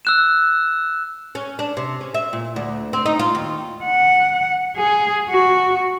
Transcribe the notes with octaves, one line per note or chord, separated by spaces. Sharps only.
E6 F#6 E7
C#4
D4
C3
C#4
E5
A#2
D2
C4
D#4
F4
D#2
F#5
G#4
F#4